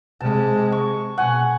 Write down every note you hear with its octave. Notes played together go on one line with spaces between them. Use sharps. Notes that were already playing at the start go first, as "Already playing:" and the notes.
C3 G#3 A5
C#6
B2 F#5 G#5 C#6